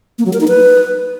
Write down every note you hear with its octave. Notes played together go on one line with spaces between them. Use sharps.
A#3
F#3
A#4
D#4
B4